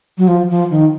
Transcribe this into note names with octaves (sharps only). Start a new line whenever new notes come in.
F#3
F3
F3
D#3